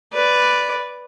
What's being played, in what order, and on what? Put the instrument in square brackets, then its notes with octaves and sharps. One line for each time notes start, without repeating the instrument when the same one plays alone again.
[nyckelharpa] B4 D5